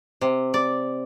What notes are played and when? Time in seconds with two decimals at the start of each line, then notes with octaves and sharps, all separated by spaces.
0.21 C3
0.54 D5